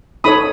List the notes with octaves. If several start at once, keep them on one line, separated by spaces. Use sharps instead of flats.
D#4 A4 C#5 B5 D#6